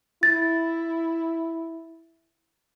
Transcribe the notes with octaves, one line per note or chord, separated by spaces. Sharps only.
E4 A6